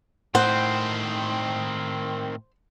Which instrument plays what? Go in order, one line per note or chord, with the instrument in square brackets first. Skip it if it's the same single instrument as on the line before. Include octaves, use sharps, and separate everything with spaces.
[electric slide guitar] A2 [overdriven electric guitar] D#3 C4 [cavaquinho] C5 [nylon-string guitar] F#5